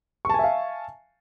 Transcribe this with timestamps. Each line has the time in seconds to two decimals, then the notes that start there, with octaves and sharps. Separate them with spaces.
0.25 C#6
0.29 A5
0.34 G#5
0.39 E5
0.44 F5